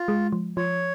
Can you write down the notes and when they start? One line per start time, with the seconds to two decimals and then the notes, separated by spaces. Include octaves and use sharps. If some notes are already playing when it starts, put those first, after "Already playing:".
Already playing: F4
0.08 G#3
0.33 F3
0.57 F3 C#5